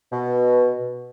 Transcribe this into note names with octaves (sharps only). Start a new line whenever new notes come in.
B2